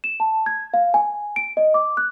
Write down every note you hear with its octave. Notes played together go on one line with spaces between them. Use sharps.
E7
A5
G#6
F5
G#5
D7
D#5
D6
F#6